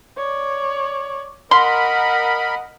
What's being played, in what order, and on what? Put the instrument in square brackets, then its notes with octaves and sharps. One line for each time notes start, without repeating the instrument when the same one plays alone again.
[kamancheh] C#5 D5
[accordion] A#4 B5 [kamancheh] D#5 F#5 [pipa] C6